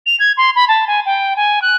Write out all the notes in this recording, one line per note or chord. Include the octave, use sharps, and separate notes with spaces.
F7
G#6
C6
B5
A5
G#5
G5
G#5
F#6